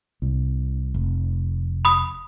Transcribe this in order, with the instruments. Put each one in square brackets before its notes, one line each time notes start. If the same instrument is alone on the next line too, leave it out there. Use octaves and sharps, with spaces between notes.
[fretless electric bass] C2
F1
[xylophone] B5 D#6